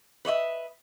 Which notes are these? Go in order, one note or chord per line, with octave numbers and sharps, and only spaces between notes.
B4 C#5 D#5 E5